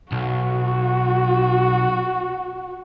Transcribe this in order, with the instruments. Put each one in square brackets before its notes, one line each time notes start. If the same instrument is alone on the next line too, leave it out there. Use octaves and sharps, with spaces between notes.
[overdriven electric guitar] B1 [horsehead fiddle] F#4